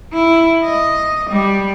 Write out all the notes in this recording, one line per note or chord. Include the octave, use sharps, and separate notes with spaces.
E4
D#5
G3